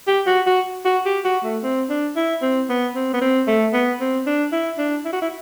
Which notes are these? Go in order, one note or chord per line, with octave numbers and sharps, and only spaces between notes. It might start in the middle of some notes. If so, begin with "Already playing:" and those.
G4
F#4
F#4
F#4
G4
F#4
A3
C4
D4
E4
C4
B3
C4
B3
C4
A3
B3
C4
D4
E4
D4
E4
F#4
E4